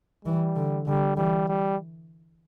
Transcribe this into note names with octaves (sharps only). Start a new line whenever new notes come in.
E3 G3
D3
D3 G3
E3 G3
G3